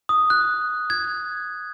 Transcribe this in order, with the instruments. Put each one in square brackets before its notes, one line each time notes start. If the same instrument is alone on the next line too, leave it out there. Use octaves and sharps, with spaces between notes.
[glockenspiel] D#6
F#6
G#6